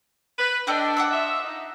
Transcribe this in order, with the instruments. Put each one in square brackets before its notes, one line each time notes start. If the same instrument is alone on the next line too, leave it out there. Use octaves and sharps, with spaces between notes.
[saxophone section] B4
[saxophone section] D4 [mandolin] A4 D#5 G5
[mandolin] F#5 D6 E6
[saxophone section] F4 D#5 E5
D#4